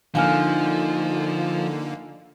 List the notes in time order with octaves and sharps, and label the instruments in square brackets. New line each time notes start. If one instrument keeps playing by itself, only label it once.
[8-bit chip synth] D3 A#3 [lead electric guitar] F3 [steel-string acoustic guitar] D4 D#4 [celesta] F5 G#5 F6